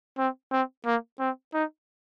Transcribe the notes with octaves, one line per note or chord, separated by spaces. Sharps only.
C4
C4
A#3
C4
D#4